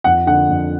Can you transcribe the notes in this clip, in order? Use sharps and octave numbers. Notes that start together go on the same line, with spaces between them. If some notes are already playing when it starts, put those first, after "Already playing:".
F2 F#5
D3 F#5
F2